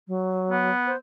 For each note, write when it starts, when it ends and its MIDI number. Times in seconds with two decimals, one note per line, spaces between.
0.08 0.71 54
0.51 0.92 59
0.87 0.97 72